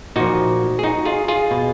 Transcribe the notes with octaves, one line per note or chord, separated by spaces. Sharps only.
A#2 F3 D#4 F#4
G#4
D#4 F#4
F4 G#4
F4 G#4
B2